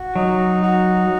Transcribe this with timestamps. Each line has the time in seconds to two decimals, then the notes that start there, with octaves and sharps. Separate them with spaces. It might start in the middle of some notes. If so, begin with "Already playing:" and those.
Already playing: F#4
0.16 F#3 D#4
0.62 F#4